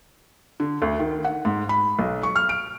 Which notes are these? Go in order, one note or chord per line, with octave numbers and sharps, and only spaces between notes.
D3
D2
D#3
F#5
G#2
B5
B1
C#6
F6
D7